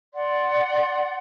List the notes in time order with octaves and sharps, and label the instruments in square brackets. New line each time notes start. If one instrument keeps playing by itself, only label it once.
[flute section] D5 F#5 C6